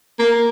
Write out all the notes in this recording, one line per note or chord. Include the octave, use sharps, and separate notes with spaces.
A#3